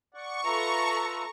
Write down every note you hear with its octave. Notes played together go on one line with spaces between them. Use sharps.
D5 F#5 C#6
F4 A4 B4 E5 A#5